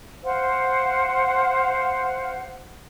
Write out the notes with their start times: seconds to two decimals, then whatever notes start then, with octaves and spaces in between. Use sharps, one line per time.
0.24 C5 F5 F#5